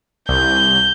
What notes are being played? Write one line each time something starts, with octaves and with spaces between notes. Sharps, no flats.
C2 G6